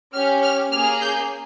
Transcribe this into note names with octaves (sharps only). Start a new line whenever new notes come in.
C#4 G4 F6
F6
A#3 C#4 G#4 F6
G6